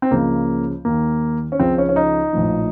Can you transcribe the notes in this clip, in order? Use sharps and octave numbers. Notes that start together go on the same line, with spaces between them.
C4
C#2 C#3 F3 A#3
D#2 D#3 A#3
C#4
C#2 C#3 F3 C4
C#4
C#4
D#4
A#1 A2 F3